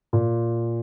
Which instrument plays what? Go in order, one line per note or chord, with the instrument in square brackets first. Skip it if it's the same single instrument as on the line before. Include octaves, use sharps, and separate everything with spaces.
[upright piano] A#2